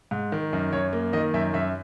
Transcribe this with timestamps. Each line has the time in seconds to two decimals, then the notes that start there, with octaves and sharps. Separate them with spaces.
0.11 G#2
0.32 D#3
0.53 F#2
0.73 F#2 C#5
0.93 A#3
1.13 D#3 D#5
1.34 F#2 E5
1.54 F#2 E5